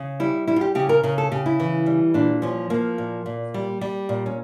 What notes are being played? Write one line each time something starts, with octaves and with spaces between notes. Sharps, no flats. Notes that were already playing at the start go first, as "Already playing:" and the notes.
Already playing: C#3
G3 E4
G3 E4
F4
G4
C#3 G4
A#4
C#3 A#4
A4
C#3 G4
E4
E3
G3
A#2 D4
F3 C#4
F3 A#3
A#2
A#2
G3
G3
A#2
C#4